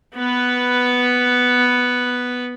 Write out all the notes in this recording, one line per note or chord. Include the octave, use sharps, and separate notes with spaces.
B3 B4